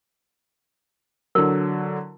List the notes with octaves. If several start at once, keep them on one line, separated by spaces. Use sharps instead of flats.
D3 F#3 E4 A#4